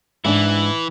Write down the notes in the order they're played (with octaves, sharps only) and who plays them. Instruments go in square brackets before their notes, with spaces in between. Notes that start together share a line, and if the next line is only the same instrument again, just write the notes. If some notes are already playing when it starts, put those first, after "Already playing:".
[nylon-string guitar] G#2 D4 [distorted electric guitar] E3 E4